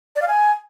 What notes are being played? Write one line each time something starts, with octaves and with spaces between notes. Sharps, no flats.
D5
F5
G#5